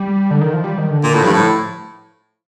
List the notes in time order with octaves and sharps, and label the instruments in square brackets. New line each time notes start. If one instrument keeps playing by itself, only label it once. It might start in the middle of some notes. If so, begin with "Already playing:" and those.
Already playing: [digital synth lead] G3
D3
D#3
F3
G3
D#3
D3
[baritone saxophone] A#2 [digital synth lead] D3
[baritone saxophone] A2
[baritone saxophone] G2 [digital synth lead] F3
[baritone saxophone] A2